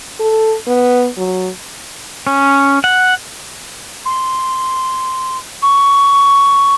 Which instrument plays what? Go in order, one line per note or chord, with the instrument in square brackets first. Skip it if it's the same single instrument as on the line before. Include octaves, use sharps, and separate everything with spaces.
[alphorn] A4
B3
F#3
[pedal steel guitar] C#4
F#5
[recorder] C6
C#6